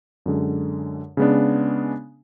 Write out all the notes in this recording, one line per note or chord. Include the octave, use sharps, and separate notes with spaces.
F#2 D3 G#3
C#3 G#3 B3 D4